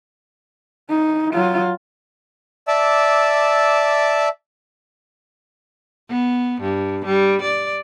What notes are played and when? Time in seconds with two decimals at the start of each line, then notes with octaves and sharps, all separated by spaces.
0.90 D#4
1.34 F#3 F4
2.68 D5 E5 A5 D6 E6
6.09 B3
6.61 G2
7.06 G3
7.42 D5